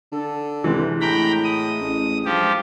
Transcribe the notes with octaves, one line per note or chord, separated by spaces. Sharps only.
D3 A4
C3 E3 G#3
A2 G5 A#5 B5
D#6
A1
G2 F3 G4